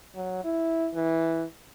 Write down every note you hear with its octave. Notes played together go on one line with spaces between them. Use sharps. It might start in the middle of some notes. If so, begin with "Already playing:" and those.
F#3
E4
E3